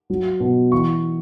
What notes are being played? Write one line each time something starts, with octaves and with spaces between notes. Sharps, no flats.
F#3
B2
E3 C#6